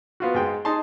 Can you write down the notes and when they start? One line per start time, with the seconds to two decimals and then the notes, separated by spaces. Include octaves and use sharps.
0.20 B3 F4 F#4
0.34 G#2 G#3 G5
0.65 D#4 G#4 A5 C6